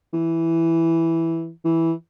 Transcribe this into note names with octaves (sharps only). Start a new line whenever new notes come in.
E3
E3